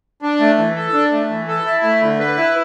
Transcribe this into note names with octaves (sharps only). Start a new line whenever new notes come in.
D4
A3
E3
A4
D4
A3
E3
A4
E4
A3
D3
B4
E4